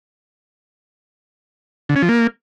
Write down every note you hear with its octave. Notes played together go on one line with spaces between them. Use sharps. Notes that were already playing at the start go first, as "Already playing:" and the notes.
D3
C#4
F3
A#3